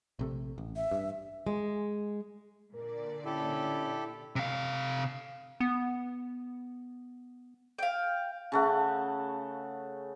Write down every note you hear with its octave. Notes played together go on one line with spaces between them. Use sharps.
A#1 C3 A3
A1
E5
G2
G#3
A#2 D3 A#4 D5
C#4 E4 G4 A4 E5
C3 F5
B3
F5 G5
C#3 A3 F#5